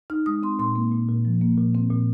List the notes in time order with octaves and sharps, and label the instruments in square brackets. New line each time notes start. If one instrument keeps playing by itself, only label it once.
[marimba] D#4 F6
G#3 D#6
C4 C6
A#2 C6
A#3
A#2
A#2
F3
A#3
A#2
C4
A#2